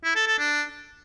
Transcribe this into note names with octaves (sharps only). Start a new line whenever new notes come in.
E4
A4
A4
D4